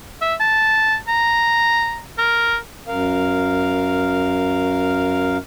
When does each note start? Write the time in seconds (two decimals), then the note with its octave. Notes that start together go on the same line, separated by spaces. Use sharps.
0.21 E5
0.40 A5
1.08 A#5
2.18 A#4
2.88 F#2 A#4 F5